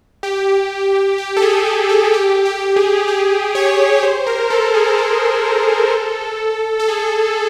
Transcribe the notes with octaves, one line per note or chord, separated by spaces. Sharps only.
G4
G4
A4
G#4
A4
A4
G#4
G4
G4
G#4
G4
C#5
C5
A#4
A4
G#4
G#4
A4
A4
G#4